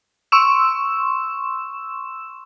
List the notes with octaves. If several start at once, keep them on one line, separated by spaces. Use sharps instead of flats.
C6 C#6 E6 E7